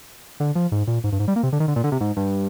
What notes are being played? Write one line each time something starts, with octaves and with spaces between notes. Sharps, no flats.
D3
F3
G#2
A#2
G#2
G2
G#2
G3
A#3
C3
D3
D#3
D3
A#2
D3
C3
G#2
G2